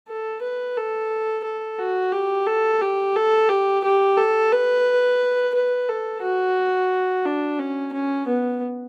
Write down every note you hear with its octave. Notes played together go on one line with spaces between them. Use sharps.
A4
B4
A4
A4
F#4
G4
A4
G4
A4
G4
G4
A4
B4
B4
A4
F#4
D4
C#4
C#4
B3